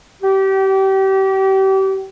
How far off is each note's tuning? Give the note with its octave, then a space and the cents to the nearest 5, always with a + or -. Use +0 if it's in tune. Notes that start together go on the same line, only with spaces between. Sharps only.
G4 -30